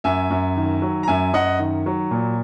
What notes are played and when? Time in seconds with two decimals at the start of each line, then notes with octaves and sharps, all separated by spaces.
0.04 F#2 E5 G#5
0.30 F#2
0.57 D#3
0.82 F#3
1.03 A#5
1.08 F#2 E5 G#5
1.33 F#2 D#5 F#5
1.59 D#3
1.86 F#3
2.11 A#2